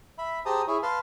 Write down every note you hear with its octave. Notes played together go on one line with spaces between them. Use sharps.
E5 B5
G4 G#4 C5 A5 A#5 D#6
E4 G#4 C#5
B4 F5 A5 C6